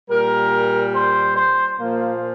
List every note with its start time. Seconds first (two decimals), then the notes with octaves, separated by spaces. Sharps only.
0.10 A#2 G3 A#4
0.94 C5
1.36 C5
1.78 A#2 F3 A#3